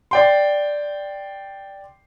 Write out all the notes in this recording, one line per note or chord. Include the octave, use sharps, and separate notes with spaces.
D5 G5 C6